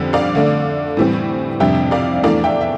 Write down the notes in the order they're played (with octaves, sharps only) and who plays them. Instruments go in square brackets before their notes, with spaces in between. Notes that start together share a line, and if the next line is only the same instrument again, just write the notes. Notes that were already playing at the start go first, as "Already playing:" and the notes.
Already playing: [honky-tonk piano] F2 D3 G3 C4
D5 F5
D3 A3 D4
A2 E3 G3 C4
F2 C3 G3 D4 E5 G5
D5 F5
E2 E3 A3 D4 D5 F5
E5 G5
E5